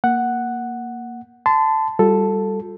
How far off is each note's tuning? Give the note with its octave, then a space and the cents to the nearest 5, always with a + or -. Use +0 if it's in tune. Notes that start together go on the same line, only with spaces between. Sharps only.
A#3 +0 F#5 +0
A5 +0 C6 -35
G3 +0 F4 +45 A4 +0